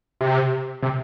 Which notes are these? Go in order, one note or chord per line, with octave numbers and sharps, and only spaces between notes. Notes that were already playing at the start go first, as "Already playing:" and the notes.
C3
C3